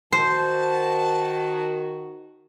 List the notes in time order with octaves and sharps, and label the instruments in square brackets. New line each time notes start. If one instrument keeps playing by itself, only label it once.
[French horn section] D#3 F#4 [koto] C5 [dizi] A5